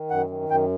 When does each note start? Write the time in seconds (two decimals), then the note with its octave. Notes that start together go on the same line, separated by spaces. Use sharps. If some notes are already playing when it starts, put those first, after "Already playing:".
Already playing: D#3
0.10 F#2 F#5
0.30 D#3
0.49 F#2 G5